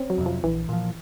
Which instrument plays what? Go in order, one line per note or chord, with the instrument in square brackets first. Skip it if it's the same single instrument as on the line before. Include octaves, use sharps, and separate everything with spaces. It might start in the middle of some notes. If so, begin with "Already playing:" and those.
Already playing: [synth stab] C4 C#4
F#3
[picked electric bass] F2 C3
[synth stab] F3
[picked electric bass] A#1 [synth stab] E3
[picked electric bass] A#2 F3